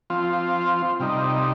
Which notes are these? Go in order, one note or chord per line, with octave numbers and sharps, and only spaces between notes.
F3 C4 F4
C3 G3 D#4